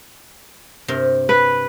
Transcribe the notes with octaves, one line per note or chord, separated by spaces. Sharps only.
G2 C3 A#4
B4